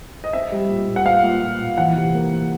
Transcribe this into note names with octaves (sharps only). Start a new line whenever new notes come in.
D#5
C4 E5
G3
A#2
A#2
F#5
A#2 F5
A#2
A#2
A#2
E3 F#5
C3
A#3
C3